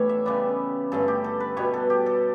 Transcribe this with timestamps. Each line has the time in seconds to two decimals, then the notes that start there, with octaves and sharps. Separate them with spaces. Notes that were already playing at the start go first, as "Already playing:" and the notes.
Already playing: A2 E3 G3 B3 D4 C#5
0.09 E5
0.26 C#3 G3 B3 D5
0.92 G2 D3 A3 C#4 A4
1.08 G4
1.24 A4
1.40 B4
1.57 B2 G3 B3 C#5
1.74 A4
1.90 G4
2.06 A4